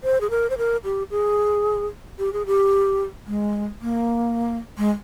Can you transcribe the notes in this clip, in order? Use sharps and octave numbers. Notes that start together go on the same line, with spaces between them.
C5
G#4
A#4
C5
A#4
G4
G#4
G4
G#4
G4
G#3
A#3
G#3